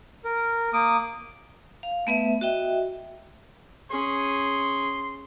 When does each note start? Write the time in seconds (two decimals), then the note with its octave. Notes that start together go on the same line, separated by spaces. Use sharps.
0.25 A#4
0.73 A#3 D6 D#6
1.83 F5
2.07 A3 B3 B4 E5
2.41 F#4 D#5 E5 G5
3.91 C#4 G#4 C6